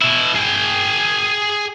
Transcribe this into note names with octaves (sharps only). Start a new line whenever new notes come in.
B2 E4
G#4 G5